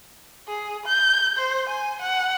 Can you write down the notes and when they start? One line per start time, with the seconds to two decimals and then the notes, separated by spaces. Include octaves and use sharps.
0.48 G#4
0.86 G6
1.38 C5
1.69 G#5
2.02 F#5